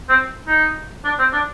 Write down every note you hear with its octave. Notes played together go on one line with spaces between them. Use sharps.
C4
D#4
D4
C4
D4